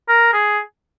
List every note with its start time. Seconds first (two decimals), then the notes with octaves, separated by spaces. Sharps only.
0.08 A#4
0.33 G#4